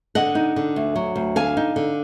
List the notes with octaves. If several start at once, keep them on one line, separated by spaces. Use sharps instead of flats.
D3 D#5 F#5
D#4
D3
D2
F#3
D2
D3 F5 G#5
D#4
D3